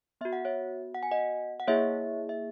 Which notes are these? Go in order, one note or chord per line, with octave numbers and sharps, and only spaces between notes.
B3 F#4 E5
F#5
C#5 E5
F#5
G#5
D#5 F#5
F#5
A#3 E4 G#4 C#5 E5
E5